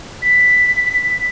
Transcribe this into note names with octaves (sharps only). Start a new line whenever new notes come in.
B6